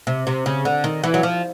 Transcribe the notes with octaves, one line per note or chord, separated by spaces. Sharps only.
C3
C3
C#3
D3
D#3
E3
F#3
F3